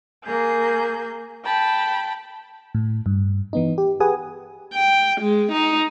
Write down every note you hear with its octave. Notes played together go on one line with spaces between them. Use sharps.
A#3 G#4 G6
G5 A5 B5
A2
G2
E3 B3 D#4
G4
G4 G#4 B4 F#5 G#5 D#6
G5
G#3
D#4